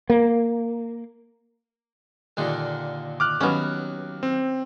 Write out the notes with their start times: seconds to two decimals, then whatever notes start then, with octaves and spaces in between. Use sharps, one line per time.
0.10 A#3
2.37 D#2 A#2 D3
3.20 D6 F6 F#6
3.41 D#2 F#3 B3 C#4
4.23 C4